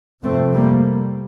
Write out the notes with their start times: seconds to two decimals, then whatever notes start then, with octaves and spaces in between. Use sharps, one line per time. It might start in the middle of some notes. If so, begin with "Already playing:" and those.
0.23 F2 C3 A3 C4
0.54 G3 A#3